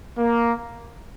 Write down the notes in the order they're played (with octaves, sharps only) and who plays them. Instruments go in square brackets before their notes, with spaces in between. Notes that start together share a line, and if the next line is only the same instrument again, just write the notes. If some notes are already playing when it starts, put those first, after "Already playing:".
[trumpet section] A#3